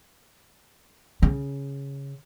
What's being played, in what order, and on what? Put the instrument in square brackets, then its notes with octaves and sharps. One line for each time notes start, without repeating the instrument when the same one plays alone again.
[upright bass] C#3